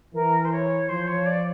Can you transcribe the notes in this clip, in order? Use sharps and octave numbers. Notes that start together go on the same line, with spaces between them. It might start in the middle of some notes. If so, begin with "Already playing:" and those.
E3 A#4
C5
C#5
F3 C5
C#5
D5